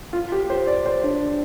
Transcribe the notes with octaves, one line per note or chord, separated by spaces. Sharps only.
F4
G4
C5
D5
C5
D4